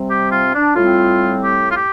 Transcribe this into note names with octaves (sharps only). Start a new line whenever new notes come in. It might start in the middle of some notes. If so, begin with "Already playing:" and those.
Already playing: C3 G3 C4
G4
F4
D4
A2 G3 C4 F4
G4
F4
G4